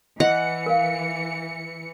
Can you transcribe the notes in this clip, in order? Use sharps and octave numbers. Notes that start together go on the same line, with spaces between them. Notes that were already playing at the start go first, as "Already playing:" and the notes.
E3 D#5 F#5 C#7
A#4 F5